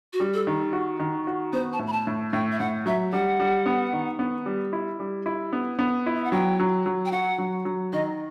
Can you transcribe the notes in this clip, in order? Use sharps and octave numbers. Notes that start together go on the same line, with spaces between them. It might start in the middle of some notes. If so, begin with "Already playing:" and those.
F#4
G3
A4
D#3
F#4
D#3
F#4
B3 C5
A5
A2
B5
A5
A2
A2 G5
E5
A2 F#5
F#3 E5
G3 F#5
G3
B3
D#3
B3
G3
E4
G3
E4
B3
B3
E4
E5
F#5
F#3 G5
F#3
F#3
G5
F#4 F#5
F#3
F#3
D#3 D#5